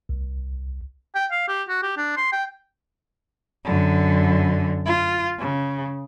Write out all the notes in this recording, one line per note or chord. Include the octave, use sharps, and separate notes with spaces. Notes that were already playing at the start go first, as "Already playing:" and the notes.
C2
G5
F5
G4
F#4
G4
D4
C6
G5
F#2 D3
F4
C#3